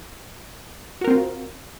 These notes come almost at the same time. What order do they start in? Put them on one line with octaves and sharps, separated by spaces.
F#4 A#4 C4 F4